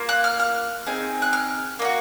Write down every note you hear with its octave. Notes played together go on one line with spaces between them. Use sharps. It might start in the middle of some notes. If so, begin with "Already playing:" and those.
Already playing: A#3 F4
F#6
F6
F6
C4 D#4 G#4
F#6
F6
A#3 D#4
F#4